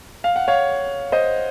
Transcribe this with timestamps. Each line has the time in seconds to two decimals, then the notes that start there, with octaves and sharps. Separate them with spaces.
0.24 F5
0.36 F#5
0.48 C#5 F5
1.12 C5 D#5